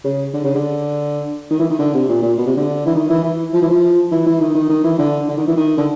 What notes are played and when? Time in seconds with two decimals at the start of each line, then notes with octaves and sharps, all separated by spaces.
0.04 C#3
0.34 D3
0.44 C#3
0.55 D3
1.51 D#3
1.59 E3
1.70 D#3
1.79 D3
1.94 C3
2.09 A#2
2.22 A#2
2.38 B2
2.47 C3
2.57 D3
2.86 E3
2.95 D#3
3.10 E3
3.24 E3
3.53 F3
3.62 E3
3.70 F3
4.12 E3
4.26 E3
4.41 D#3
4.55 D#3
4.69 D#3
4.84 E3
4.99 D3
5.28 D3
5.38 D#3
5.47 E3
5.57 D#3
5.78 D3